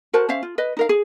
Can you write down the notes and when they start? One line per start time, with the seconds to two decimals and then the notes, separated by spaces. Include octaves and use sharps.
0.13 F#4 A#4 C5 A5
0.29 C#4 C5 E5 F5
0.43 F4
0.58 B4 D#5
0.77 D#4 A#4 F5
0.89 G#4